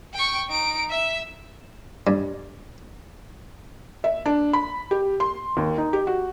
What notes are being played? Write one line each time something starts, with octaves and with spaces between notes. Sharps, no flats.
G5 C#6
D#4 D7
E5 E6
G2
E5
D4
B5
G4
C6
D#2
D#4
G4
F#4